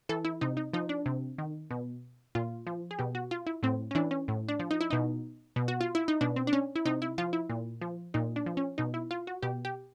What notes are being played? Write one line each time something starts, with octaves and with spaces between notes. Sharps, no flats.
E3 A4
E4
C3 D#4
D#4
F3 D#4
D4
C3
D#3
B2
A#2 F4
F3
G#4
B2 G4
F#4
F4
E4
A2 C4
C#4
E3 D4
C#4
A2
D4
F3
D#4
E4
B2 D#4
B2
F#4
F4
E4
D#4
B2 D4
C4
D4
C#4
E4
C3 D#4
E4
F3 F4
E4
A#2
F3
A#2 D#4
D4
F3
C#4
B2 D#4
E4
F4
F#4
B2 G4
G4